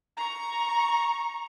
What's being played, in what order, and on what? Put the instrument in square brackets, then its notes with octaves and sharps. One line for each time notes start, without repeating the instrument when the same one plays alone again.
[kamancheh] A#5 C#6